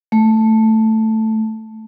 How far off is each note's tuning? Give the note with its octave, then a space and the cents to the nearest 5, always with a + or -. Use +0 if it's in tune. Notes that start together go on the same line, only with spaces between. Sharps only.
A3 +5